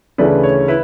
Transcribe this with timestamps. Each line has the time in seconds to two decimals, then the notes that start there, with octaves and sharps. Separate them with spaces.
0.18 D2 C#3 E3 A3 B4 D5
0.43 C#5
0.68 E4 B4